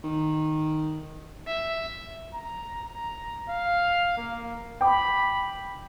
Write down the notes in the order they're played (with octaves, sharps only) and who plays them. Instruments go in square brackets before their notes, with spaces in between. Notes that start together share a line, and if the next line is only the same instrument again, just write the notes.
[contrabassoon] D#3
[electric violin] E5
[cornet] A#5
A#5
F5
A#3
[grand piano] G5 D6 [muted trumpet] B5